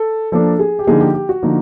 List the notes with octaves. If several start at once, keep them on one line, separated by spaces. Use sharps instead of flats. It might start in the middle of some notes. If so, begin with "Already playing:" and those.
Already playing: A4
F3 A#3 D4 A4
G#4
G4
D3 F3 A#3 D#4 G#4
G4
G4
F#4
D3 F3 A#3 D#4